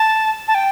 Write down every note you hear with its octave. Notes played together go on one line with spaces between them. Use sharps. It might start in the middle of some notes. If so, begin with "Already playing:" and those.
Already playing: A5
A5
G5